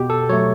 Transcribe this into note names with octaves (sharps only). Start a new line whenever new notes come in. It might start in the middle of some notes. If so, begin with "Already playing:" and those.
Already playing: B2 G4
A4
F#3 A3 C#5